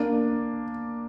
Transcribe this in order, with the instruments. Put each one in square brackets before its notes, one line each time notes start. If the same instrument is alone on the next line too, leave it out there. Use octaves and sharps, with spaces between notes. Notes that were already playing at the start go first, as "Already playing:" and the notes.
Already playing: [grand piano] A#3 D4